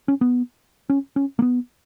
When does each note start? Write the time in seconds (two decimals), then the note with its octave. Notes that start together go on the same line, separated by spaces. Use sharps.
0.08 C#4
0.21 B3
0.90 C#4
1.16 C#4
1.39 A#3
1.42 B3